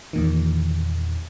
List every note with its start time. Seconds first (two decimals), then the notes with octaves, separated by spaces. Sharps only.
0.13 E2 A#2 D#3